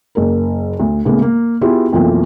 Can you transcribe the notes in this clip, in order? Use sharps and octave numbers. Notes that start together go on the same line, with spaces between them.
F#1 A#4
D2
A2 C#3 G#3 A#3 B3
A#3
B3 E4 F4 G4 G#4
B1 F2 E3 F3 A3 A#3